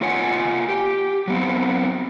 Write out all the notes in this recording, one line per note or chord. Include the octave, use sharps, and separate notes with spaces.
A#3 F4 C#5 F#5 G#5
G4
F#3 B3 C4